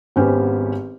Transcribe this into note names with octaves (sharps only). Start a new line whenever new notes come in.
G#1 B3 C#4 G4 C5